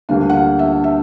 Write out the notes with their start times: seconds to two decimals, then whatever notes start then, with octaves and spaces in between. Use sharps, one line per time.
0.09 D2 D3 G3 A#3 D4 F5
0.30 F#5
0.33 F5
0.59 E5
0.84 E5